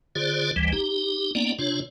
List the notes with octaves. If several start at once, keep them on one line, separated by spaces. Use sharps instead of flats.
D3 F4 G#4 C5 D5
G#1 D2 E3 G3
D#4 G4
A#3 B3 C#4 D#4 D5
C3 D4 F4 C#5